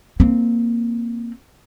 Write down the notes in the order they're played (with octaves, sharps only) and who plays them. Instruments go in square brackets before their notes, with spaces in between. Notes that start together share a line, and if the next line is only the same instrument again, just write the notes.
[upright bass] A#3 C4